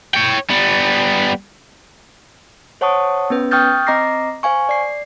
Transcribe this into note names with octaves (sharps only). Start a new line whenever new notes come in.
C#5 G5
G3 B3
C5 C#5 F#5 A5 C#6 D#6
B3 C#4 B4
G5 C#6 D#6 F6 G6 A6
C4 D#5 A#5 D6 A#6 C7
C5 F5 G#5 C#6
D5 C7